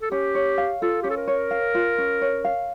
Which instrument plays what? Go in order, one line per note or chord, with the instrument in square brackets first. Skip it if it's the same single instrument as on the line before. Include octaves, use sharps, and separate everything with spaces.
[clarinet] A4
[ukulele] C#4 [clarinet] G4
[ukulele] C#5
F5
[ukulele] F4 [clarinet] A4
[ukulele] C#4 [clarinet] G4
[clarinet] A4
A#4
[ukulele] C#5
F5
F4
C#4
C#5
F5